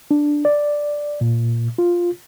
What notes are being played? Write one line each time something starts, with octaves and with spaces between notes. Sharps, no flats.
D4
D5
A#2
F4